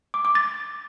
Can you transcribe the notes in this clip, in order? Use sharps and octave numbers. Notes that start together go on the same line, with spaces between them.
D6
D6
A6